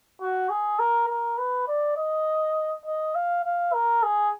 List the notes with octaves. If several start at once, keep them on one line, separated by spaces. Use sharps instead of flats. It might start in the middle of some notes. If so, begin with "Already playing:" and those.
F#4
G#4
A#4
A#4
B4
D5
D#5
D#5
F5
F5
A#4
G#4